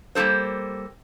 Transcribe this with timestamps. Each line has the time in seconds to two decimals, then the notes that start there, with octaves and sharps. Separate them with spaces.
0.15 G3 A#3 D#4 A4 C5